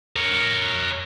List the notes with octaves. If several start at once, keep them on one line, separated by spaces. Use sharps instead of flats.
A#4 C#5